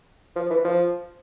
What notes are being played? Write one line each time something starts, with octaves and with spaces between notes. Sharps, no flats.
F3
E3
F3